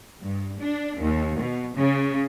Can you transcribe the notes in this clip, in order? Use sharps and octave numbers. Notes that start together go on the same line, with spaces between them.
G2
D4
D#2
B2
C#3